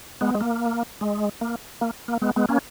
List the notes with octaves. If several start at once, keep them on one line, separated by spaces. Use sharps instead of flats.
G#3 B3
G#3
A#3
G#3
A#3
A#3
A#3
G#3 B3
G#3 B3
A#3 C#4